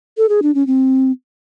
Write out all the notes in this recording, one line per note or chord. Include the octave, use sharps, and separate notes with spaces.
A4
G#4
D4
C#4
C4